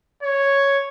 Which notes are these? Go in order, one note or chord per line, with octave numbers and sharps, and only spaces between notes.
C#5